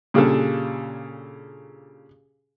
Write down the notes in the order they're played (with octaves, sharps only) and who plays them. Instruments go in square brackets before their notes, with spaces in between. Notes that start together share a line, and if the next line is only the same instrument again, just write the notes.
[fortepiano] A#2 C#3 G3 D4 G#4 A4